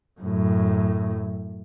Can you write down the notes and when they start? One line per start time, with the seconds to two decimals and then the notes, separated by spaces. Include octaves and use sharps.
0.20 F#2 A2